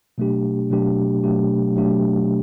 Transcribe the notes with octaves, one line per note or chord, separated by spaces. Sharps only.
B2 F#3 A3 D4 G4
B2 F#3 A3 D4 G4
B2 F#3 A3 D4 G4
B2 F#3 A3 D4 G4